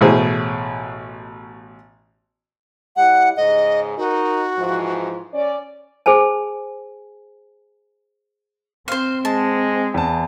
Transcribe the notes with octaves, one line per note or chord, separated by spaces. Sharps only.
A1 B2 G#4 C5
G3 E4 F#5
G#2 C#3 G#4 D#5
D#4 F#4 A#4
G#2 E3 F3
C#4 D5
G#4 C5 G#5 A5
C4 C5 F5
G#3 A5
E2 A5